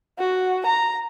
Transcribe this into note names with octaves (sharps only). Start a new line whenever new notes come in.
F#4
A#5